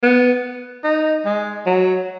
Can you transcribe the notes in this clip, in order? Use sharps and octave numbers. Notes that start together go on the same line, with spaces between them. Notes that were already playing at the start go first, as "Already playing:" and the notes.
B3
D#4
G#3
F#3